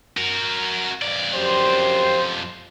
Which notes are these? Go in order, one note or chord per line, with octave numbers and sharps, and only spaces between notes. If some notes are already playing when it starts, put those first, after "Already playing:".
F#4 A#4
F2 D5
F#2 G4 C5